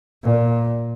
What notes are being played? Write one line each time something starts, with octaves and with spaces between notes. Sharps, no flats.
A#2